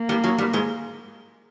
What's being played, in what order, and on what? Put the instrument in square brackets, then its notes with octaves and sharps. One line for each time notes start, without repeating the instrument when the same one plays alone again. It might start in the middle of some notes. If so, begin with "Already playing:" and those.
Already playing: [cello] A#3
[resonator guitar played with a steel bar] G2 G3
F#2 F#3
G2 G3
G#2 G#3